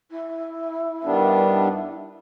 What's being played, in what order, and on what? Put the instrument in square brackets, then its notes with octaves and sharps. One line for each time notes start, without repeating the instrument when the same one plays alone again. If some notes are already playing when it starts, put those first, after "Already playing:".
[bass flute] E4
[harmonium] G2 D#3 G3 B3 D4